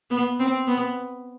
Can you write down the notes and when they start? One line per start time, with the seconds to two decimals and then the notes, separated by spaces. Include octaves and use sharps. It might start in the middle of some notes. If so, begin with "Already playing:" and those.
0.10 B3
0.40 C4
0.67 B3